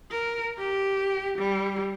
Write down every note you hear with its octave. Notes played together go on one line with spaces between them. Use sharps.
A#4
G4
G3